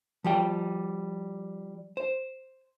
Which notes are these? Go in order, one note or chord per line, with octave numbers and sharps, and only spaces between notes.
F3 G3 G5
C5